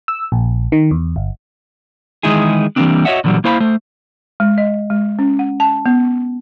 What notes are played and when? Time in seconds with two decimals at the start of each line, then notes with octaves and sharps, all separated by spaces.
0.08 E6
0.32 A#1
0.72 D#3
0.91 E2
1.16 G1
2.23 D#3 E3 G#3 D#4 E4 G#4
2.76 E3 G3 A3 A#3 C4 D4
3.05 F#4 C#5 D#5 E5 F#5
3.24 A#2 D3 E3 F#3 G3
3.44 A#3 E4 C5 F5 F#5 B5
3.60 A3 C5
4.40 G#3
4.58 D#5
4.90 G#3
5.19 C#4
5.39 F#5
5.60 A5
5.86 B3